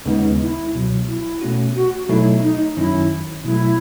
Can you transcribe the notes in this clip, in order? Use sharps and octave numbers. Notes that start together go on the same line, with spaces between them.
D#2 C#3 G#3 B3 D#4
E4
C#2 B2 F#3
E4
B2 A3 C#4 F#4
F#4
B2 F#3 A3 D#4 E4
D#4
F#2 D#3 F#3 C#4 E4
B2 F#3 A3 E4